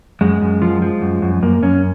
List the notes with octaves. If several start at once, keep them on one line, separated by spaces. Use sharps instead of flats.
F#2 G#3
F#2
F3
F3
F#2
F#2
F#2 A#3
F#2 C#4